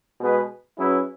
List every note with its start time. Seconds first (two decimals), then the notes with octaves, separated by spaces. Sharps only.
0.19 B2 G#3 B3 G#4 B4
0.78 F#3 C#4 E4 G#4 B4